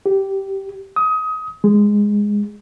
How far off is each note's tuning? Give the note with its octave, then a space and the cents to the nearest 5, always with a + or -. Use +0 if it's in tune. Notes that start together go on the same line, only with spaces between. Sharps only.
G4 -15
D#6 +25
G#3 -10